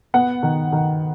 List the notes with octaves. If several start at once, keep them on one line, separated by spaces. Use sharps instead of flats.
B3 F#5
D#3
D#3